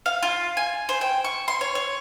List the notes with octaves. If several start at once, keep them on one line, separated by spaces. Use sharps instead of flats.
F5
F4
G#5
C5
G5
C#6
C6
C#5
C#5